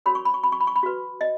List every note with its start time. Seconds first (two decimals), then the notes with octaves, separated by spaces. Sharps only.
0.06 F#4 A#4 C#5 B5
0.15 C#6
0.25 B5
0.34 C#6
0.44 B5
0.52 C#6
0.60 B5
0.67 C#6
0.76 B5
0.83 F#4 B4
1.21 D#5